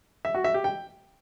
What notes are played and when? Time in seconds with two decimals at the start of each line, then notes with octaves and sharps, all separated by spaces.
0.25 E5
0.35 F#4
0.44 E5
0.54 G4
0.64 G5